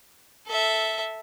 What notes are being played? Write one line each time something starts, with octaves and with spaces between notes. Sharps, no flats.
A4 E5